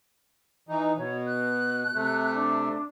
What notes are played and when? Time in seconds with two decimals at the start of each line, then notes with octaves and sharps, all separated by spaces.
0.69 E3 D#4
0.97 B2 C#5
1.26 F#6
1.95 C3 A3
2.35 D4